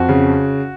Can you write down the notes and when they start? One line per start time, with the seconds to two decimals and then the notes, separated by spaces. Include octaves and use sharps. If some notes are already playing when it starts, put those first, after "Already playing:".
Already playing: F2 F#4
0.09 C#3